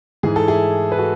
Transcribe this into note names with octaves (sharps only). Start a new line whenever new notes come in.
G#2 E3 G#4
A4
E4 G#4
B4
F#4 A4